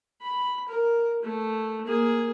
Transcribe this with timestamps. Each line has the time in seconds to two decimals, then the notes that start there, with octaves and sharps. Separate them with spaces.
0.21 B5
0.68 A#4
1.22 A3
1.87 A#3 G#4